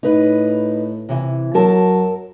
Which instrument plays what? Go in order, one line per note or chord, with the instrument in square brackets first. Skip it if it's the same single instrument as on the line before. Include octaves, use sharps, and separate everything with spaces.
[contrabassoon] A2 [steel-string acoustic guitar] D#4 B4
[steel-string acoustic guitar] C3 E3
[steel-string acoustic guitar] F#2 A#4 A5 [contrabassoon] F#3